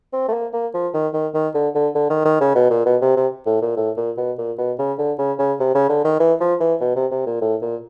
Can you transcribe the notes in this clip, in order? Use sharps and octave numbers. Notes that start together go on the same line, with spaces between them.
C4
A3
A#3
A#3
F3
D#3
D#3
D#3
D3
D3
D3
D#3
D#3
C#3
B2
A#2
B2
C3
C3
A2
A#2
A2
A#2
B2
A#2
B2
C#3
D3
C#3
C#3
C3
C#3
D3
D#3
E3
F3
E3
B2
C3
C3
A#2
A2
A#2